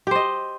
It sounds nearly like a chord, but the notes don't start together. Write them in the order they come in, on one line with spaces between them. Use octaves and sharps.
G4 C5 D#5